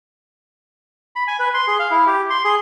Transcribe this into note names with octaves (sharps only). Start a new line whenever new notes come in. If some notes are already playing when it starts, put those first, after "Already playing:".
B5
G#5
B4
C6
G#4
F5
E4
G4
C6
G#4